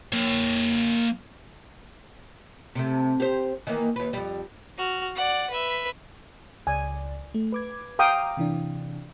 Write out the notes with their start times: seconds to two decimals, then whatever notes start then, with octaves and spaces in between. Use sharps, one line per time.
0.12 A#3 C#5
2.75 C3 A3
3.20 G4 C5
3.67 D#3 E3 A#3
3.96 D#2 B4
4.13 F2 G3
4.78 F#4 F6
5.16 D5 F#5
5.50 B4 E5
6.67 C#2 D5 G#5
7.34 A3
7.52 B4 D6 G#6
7.99 F5 G5 A#5 D6 D#6
8.37 C3 E3 D4